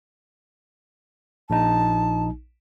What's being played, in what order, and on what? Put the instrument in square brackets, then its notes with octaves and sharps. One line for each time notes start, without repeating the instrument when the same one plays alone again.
[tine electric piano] A#1 D#4 [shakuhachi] A5